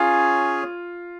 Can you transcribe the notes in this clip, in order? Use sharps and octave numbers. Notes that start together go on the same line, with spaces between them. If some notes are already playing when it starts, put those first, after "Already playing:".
Already playing: C#4 F4 G#4 C#5